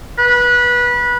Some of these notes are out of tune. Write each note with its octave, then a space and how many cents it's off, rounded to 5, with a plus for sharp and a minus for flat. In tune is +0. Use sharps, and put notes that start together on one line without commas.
B4 -20